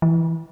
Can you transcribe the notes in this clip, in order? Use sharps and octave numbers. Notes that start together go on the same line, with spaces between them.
E3